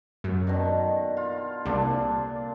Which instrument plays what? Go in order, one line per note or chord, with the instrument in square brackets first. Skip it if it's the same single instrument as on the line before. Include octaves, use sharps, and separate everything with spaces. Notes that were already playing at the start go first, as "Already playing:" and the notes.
[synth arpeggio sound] F#2
[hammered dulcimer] B2 D3 D#3
F4
[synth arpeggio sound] C2 [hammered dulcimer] A#2 D4 A4